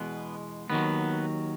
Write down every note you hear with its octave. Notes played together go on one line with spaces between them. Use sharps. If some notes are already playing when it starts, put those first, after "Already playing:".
Already playing: E2 B2 G#3 B3
D#2 D#3 F#3 B3